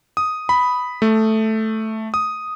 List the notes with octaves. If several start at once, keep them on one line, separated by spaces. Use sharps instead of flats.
D#6
B5
A3
D#6